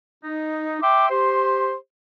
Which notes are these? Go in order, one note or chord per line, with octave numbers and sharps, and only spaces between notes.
D#4
E5 G5 C6 D6
G4 C5 C6